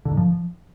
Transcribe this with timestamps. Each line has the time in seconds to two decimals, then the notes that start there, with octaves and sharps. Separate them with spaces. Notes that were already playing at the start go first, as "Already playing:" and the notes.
0.05 D3
0.11 G#2
0.17 F3